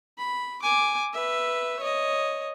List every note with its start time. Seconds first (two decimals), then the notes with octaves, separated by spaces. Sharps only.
0.18 B5
0.62 G#5 D6
1.13 B4 E5
1.80 C#5 D#5